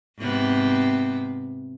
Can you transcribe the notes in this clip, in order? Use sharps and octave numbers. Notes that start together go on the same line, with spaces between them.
G#2 C3 B3